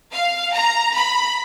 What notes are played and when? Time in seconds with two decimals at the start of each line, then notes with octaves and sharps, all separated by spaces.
0.12 F5
0.53 A#5
0.95 B5